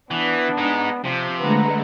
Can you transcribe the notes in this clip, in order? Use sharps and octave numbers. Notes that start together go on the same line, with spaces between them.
E3 B3 D4
G#3 D#4
C3 F3
D3 G#3 A3 B4 F#5 A#5